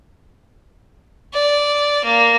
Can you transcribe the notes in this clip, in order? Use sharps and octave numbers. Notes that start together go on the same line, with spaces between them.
D5
A#3